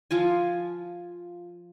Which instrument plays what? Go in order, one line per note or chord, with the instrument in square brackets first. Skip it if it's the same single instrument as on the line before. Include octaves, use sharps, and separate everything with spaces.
[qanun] F3 F4 G#5